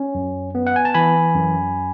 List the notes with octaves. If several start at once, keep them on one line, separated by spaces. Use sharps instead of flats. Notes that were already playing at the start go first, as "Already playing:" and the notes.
Already playing: C#4
F#2
B3
F#5
G#5
A5
E3 G#5 B5
F#2